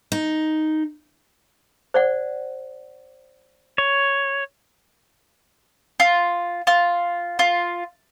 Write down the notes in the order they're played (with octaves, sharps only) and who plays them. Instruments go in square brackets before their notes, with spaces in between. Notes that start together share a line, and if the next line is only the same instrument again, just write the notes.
[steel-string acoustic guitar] D#4
[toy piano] C5 D5 F#5
[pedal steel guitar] C#5
[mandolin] F4
F4
F4